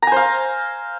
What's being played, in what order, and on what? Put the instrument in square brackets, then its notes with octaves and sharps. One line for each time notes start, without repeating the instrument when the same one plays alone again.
[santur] A#5
G#5
C5
F5